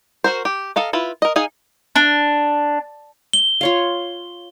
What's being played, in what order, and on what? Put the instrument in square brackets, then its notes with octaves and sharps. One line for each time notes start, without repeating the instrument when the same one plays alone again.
[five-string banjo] F#4 A#4 C5
G4
A4 D#5 F5 A#5
E4 F4 B4
A#4 D#5
D#4 G#4 F5 G#5
[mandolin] D4
[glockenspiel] G7
[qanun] F4 C#5 F5